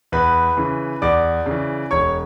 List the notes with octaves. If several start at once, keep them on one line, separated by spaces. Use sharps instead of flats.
E2 B4 B5
C#3 E3
E2 D5 D6
C#3 E3
E1 C#5 C#6